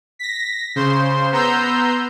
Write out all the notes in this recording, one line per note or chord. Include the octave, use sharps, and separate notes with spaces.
A#6 B6
C#3 C5 C6
B3 A#5 C6 E6 G6